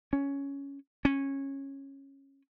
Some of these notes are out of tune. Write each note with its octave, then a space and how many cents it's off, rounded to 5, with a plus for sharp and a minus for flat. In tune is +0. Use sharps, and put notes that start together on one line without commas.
C#4 +10
C#4 -15